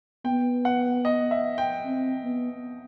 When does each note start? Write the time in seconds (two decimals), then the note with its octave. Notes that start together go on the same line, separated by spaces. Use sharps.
0.25 B3 G5
0.65 F#5
1.05 D#5
1.31 E5
1.58 G5
1.85 C4
2.25 B3